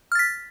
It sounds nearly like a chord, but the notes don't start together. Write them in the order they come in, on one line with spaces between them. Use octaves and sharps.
F6 A6 B6